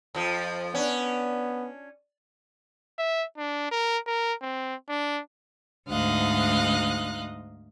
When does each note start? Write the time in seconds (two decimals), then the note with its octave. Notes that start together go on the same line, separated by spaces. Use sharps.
0.15 F2 F3
0.75 B3 C#4 D4
2.99 E5
3.38 D4
3.71 A#4
4.07 A#4
4.42 C4
4.89 D4
5.88 D2 G#2 D#4 D#5 F5 F#6